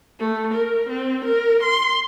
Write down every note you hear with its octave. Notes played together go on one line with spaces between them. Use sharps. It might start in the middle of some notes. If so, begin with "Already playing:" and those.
A3
A#4
C4
A#4
C6